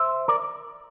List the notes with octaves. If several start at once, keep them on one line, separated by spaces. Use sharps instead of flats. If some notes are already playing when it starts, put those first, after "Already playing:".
Already playing: C5 E5
A#4 D5